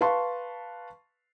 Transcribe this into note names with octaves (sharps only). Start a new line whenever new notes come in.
B4 F5 A5 C6 C#6